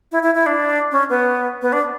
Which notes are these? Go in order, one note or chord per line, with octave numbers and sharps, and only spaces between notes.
E4
E4
E4
D4
C#4
B3
B3
D4